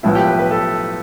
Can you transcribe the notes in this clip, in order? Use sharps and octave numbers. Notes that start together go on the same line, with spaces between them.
B1 A2 F3 B3 E4
G4
B4
B4
A4